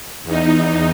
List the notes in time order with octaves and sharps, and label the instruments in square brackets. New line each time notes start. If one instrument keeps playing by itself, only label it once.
[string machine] E2 D#4